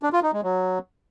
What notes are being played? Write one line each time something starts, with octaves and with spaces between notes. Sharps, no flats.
D4
F4
D#4
G#3
F#3